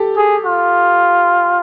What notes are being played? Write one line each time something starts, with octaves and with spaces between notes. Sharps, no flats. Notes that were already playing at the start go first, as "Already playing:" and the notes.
Already playing: G4 A4
G#4
F4